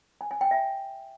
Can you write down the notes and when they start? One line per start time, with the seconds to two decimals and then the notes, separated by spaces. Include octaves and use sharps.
0.21 G#5
0.31 G#5
0.41 G5
0.51 E5